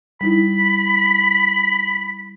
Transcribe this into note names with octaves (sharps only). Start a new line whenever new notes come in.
G3 D#4 E4 B5